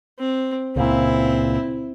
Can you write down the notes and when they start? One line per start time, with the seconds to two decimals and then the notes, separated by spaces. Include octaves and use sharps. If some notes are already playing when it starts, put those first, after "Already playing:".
0.19 C4
0.76 C#2 A#2 C4 E4